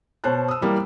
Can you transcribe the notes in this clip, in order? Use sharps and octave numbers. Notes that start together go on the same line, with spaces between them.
B2 C5 C#5 A5 F#6
D#6 E6
E3 G3 A#3